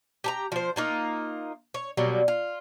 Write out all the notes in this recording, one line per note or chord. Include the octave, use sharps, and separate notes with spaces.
G4 A5 A#5
F3 C5
A#3 D#4 F4
C#5
B2 F#3 G3 A#3
F4